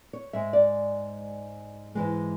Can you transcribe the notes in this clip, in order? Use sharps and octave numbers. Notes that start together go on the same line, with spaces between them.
C#5
G#2 G#3 E5
D5
G#2 E3 G#3